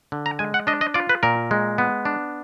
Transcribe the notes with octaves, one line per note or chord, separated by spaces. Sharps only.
D3
A#5
G#3 G#5
F#5
D4 D#5
D#5
F4 D5
B4
A#2 A#4
G#3
B3
D4